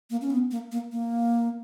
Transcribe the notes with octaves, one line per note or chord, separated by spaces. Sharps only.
A#3
C#4
B3
A#3
A#3
A#3